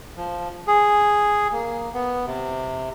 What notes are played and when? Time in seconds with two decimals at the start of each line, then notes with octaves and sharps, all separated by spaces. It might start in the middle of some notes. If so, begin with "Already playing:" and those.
0.17 F3
0.67 G#4
1.52 A#3
1.94 B3
2.27 C3